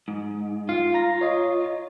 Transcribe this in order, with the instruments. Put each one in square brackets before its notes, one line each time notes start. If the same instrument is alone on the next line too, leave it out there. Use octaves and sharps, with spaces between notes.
[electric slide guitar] G#2
[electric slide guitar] F4 [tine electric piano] F5
[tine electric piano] A#5 A#6
C#5 D#5